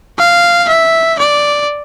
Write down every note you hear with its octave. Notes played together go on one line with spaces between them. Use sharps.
F5
E5
D5